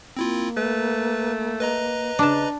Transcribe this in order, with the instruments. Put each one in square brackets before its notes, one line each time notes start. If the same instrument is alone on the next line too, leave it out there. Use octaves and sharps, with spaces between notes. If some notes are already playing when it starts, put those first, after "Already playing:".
[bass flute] A#3 [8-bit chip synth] C4 E4 F4
[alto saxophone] A3 [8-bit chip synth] B4
[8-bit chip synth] B4 D#5 A#5
[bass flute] C#3 [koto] D4 A5